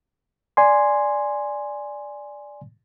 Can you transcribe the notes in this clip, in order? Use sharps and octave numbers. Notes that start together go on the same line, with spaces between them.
D5 G#5 C6